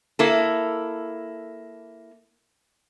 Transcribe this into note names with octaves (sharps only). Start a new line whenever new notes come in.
A#3 E4 A4